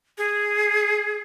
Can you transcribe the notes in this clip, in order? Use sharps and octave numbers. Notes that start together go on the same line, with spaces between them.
G#4